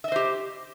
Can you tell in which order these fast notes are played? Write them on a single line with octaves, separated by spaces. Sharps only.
E5 D#5 C5 G4